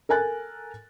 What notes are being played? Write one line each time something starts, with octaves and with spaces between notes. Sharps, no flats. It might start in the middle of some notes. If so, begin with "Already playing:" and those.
A4 A#4 G#5 F#6 A6